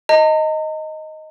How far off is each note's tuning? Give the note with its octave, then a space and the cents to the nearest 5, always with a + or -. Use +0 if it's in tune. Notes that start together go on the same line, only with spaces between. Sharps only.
D#5 +5 A#5 -45